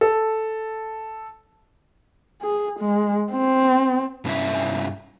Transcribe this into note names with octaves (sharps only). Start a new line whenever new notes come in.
A4
G#4
G#3
C4
G2 C3 C#4 E4 E5